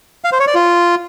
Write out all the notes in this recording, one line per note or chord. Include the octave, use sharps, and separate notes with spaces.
F5
C5
C#5
D5
F4